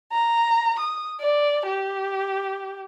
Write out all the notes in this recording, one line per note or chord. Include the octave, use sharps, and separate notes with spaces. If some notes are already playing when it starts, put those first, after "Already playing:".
A#5
D#6
D5
G4